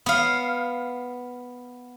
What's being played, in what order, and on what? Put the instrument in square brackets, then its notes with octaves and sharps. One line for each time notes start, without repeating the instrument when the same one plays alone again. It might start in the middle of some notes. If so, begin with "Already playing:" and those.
[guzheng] B3 F5